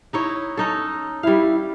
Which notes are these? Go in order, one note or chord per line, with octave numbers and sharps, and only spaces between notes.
D#4 E4 C#5
C#4 D#4 A4
G3 E4 F5